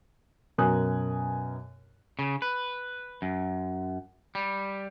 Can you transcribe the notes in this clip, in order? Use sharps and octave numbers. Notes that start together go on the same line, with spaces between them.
F#2 B2 A#4 G#5 D#6 F#6
C#3
B4
F#2
G3